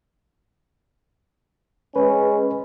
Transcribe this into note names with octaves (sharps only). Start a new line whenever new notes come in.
G#3 C#4 B4